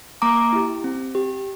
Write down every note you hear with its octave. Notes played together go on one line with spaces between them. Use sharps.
A#3 A#5 D6
E4 G4
C4
G4